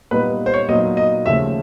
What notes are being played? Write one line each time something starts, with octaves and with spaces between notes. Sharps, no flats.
A#2 G3 B3 D#4 B4
C5
C#5
A#2 F#3 B3 D#4 D#5
D#5
D#2 C#3 F3 A3 E5